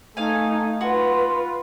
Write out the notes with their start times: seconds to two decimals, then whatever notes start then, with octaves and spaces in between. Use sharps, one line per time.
0.17 A3 D#4 F5 G#5
0.81 F4 F#4 B4